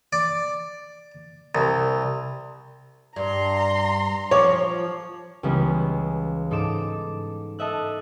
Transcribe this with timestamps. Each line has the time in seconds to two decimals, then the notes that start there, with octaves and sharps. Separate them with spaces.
0.13 D5
1.55 C2
3.16 G2 A#5 C6
4.31 F3 C#5 D6
5.43 C#2 E3 G3 G#3 B3 C#4
6.51 G#2 D#4 A4 D6 E7
7.59 A4 D#5 E5 F#6